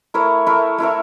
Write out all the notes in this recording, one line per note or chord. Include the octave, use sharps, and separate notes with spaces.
A3 E4 A#4 C#5
A3 E4 A#4 C#5
A3 E4 A#4 C#5